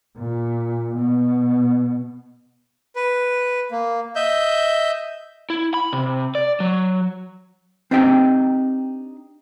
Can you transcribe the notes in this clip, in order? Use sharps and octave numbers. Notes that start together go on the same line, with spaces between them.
A#2
B2
B4
A#3
D#5 E5 G6
E4
B5
C3
D5
F#3
C4 D4 D#4 G4 G5